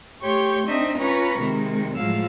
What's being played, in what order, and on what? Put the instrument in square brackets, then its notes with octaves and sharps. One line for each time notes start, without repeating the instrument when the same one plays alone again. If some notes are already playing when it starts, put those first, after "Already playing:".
[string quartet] A3 G4 C#5 C6 C#6 G6
C4 D4 D#4 D#5 E5
C#4 F4 B4 A#5 B5 C#6
C3 D#3 G#3
A2 F3 F#3 G#3 F5 E6